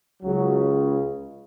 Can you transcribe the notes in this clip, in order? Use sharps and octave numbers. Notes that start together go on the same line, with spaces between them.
C#2 C#3 F#3